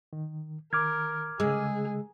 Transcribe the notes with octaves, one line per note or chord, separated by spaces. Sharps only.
D#3
D#3 A#4 D6 F6 G#6
C#3 G#3 G#4 E6